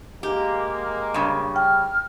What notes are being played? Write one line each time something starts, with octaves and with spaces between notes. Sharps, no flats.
G#3 A#3 G4
G2 C#3
G5 F6